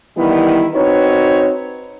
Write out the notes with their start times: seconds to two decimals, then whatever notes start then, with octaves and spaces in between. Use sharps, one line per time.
0.17 D#3 E3 G3 B3 E4
0.75 C4 D#4 F#4 B4 C#5